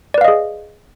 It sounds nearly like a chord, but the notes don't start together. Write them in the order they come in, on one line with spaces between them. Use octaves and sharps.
D5 B4 F5 D#5 G#4